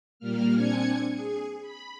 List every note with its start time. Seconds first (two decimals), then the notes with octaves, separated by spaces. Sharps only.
0.19 A#2 G3 A#3 F6
0.54 C4 D4 G#5 G#6 C#7
1.13 G#4
1.61 B5